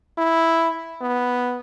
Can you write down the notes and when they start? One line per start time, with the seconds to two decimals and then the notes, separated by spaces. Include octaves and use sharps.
0.18 E4
1.01 B3